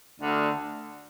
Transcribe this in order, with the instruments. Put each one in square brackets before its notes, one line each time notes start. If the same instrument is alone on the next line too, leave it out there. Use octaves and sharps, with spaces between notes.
[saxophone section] D2 D3